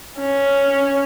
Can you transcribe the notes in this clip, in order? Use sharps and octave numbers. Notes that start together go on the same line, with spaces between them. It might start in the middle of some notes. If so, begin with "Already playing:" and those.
C#4